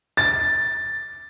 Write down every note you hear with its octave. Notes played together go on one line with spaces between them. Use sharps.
A6